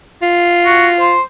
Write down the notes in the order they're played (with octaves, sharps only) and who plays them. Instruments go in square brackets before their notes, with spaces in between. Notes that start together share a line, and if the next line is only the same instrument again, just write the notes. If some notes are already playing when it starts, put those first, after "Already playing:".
[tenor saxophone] F4
[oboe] F#4
C5